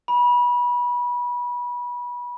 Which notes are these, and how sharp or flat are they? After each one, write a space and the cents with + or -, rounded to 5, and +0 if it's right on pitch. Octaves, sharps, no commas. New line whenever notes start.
B5 -25